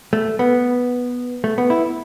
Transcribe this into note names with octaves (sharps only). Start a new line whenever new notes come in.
A3
B3
A3
B3
E4